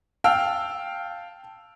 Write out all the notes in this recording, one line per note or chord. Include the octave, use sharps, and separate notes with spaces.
F5 G5 A5 E6 F6